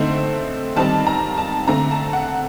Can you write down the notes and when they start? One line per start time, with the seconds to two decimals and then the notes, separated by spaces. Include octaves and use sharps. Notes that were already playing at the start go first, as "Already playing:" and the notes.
Already playing: D3 A3 C4 D#4 C5
0.76 D#3 G3 C4 D#4 A5
1.07 A#5
1.37 A5
1.68 D3 A3 C4 A#5
1.91 A5
2.13 F#5